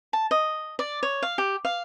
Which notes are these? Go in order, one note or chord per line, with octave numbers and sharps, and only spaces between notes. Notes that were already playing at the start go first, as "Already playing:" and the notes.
A5
D#5
D5
C#5
F5
G4
F5